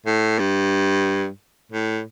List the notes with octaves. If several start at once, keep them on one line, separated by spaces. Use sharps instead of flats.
A2
G2
A2